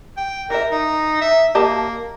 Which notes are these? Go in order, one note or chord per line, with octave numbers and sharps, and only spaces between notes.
G5
E3 A#4 E5
D#4
E5
A#3 G4 D#5 A5